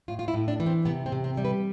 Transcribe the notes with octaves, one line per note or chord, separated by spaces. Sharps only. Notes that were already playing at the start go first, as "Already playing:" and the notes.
A2 F4
F4
E4
A2
D4
E3
C4
C3 B3
C4
C3
C4
G3
B4